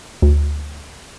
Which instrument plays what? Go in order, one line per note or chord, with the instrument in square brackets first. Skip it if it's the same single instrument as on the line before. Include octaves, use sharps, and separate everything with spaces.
[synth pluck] D2